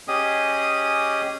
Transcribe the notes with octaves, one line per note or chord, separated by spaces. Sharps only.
C#4 G4 G#4 D#5 D#6